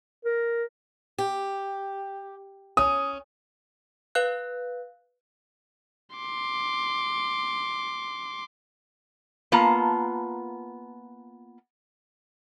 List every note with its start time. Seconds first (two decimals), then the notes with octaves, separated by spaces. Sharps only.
0.25 A#4
1.18 G4
2.77 C#4 D#6
4.15 B4 F5 F#6
6.16 C6 D6
9.52 A#3 B3 F4 A5 A#5